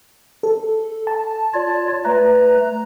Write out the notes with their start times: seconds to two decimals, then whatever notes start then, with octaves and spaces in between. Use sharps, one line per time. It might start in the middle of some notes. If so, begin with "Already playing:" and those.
0.43 A4
1.07 A5
1.54 F4 C#5 D5
2.05 A3 B4 A#5